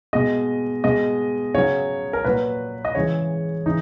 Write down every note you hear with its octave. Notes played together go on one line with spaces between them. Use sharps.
B2 G#3 D#5
B2 G#3 D#5
C#3 F#3 C#5
A#4
A#2 F#3 B4
D#5
C#3 E3 G#3 C#5
C#3 E3 G#3 D#4